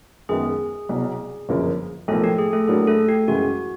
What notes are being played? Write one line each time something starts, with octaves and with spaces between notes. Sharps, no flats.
F#2 D#3 G#3 B3 G#4
C2 B2 F#3
G1 F#2 C#3 F3 A#3
B1 A2 F3 A3 A#3 A4
G4
G#4
A3 A4
A2 F#3 A#3 D4 F#4 G#4
A3 A4
G4
F#2 C#3 E3 G#3 F#4